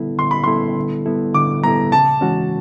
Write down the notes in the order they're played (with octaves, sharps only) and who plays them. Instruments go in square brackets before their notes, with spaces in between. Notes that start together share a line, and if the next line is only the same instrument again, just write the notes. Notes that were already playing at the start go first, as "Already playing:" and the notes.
Already playing: [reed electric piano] D3 G3 B3 E4 A4
[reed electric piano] D3 [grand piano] C6
[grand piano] B5
[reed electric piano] G3 B3 E4 A4 [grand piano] C6
[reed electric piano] D3
G3 B3 E4 A4
[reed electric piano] D3 [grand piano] D6
[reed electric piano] G3 B3 E4 A4 [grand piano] A#5
[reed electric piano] C#3 [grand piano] A5
[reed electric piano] E3 G#3 C#4 F#4